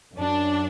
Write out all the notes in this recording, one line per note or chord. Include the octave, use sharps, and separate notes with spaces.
F#2 F#3 D4